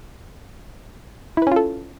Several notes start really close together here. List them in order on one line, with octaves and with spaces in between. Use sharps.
E4 B4 C#4 F4 A4